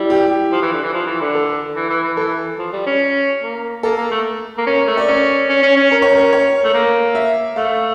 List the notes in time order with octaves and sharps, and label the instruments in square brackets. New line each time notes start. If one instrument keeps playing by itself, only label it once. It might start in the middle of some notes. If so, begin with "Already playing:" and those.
Already playing: [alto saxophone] G3 [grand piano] E4
[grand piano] G4
[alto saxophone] F3
E3
D3
E3
F3
E3
D3
[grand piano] A4
[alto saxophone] E3
E3
E3
[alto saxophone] E3 [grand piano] A4
[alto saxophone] F3
G3
C#4
A#3
[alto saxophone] A#3 [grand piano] A4
[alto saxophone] A#3
A3
A#3
[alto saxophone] C#4 [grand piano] A#4
[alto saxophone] A3
[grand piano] D5
[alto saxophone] C#4 [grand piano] C#5
[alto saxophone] C#4
C#4
C#4
[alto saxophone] C#4 [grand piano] A#4
[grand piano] C#5
A#4
C#5
[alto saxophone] A3
A#3
[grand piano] E5
[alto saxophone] A3 [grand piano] F5